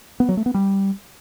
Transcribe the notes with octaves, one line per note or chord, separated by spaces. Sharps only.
B3
F#3
A3
B3
G3